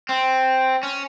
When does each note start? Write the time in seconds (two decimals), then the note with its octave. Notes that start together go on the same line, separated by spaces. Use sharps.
0.09 C4
0.83 C#4